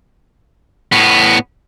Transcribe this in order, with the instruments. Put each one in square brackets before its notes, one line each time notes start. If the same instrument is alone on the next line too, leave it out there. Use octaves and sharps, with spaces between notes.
[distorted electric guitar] A2 B3